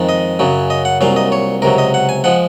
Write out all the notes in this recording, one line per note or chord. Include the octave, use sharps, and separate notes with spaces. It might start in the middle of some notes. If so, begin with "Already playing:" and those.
Already playing: F2 D#3 G#3
D#5
F#2 C#3 F#3
D#5
F#5
C2 A#2 F#3 F5
D#5
C#5
C#2 C3 F#3 A#4
D#5
F#5
G#5
F3 G#3 F#5